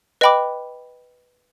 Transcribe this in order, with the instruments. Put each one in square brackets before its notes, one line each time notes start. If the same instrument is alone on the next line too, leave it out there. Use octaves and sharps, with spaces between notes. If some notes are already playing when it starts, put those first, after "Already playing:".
[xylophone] B4 D#5 G5 B5 D6